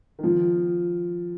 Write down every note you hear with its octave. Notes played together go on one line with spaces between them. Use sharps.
D#3
F3